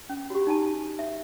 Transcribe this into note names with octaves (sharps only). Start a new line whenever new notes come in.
C#4
F#4 G4
D#4 G#5 A5
E5